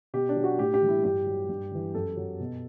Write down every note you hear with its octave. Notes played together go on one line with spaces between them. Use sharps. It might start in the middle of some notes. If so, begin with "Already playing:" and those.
B2 G4
D4
F#3
F#4
A2 G4
G4
E3 G3
E4
G2 G4
F#3
G2
E3 G3
F#2 A4
F#3
B2